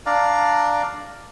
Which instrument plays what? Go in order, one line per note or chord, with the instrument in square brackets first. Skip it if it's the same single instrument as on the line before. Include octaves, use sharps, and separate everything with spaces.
[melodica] D4 D5 F5 A#5